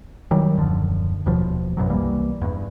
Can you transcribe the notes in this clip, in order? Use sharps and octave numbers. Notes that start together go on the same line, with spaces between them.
D#3 F#3 G3
D#1 F#2 D3 F3
E1 D#2 B2 F3
A1 F#2 B2 F#3
C2 E3 G3 A#3
E2 G2